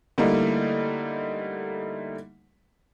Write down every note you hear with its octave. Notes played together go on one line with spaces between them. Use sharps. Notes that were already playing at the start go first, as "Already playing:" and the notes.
D3 G3 A3 A#3 D#4 E4